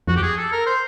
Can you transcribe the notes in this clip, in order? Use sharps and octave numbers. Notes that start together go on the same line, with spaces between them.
F2 F#4
G4
G#4
A4
A#4
C5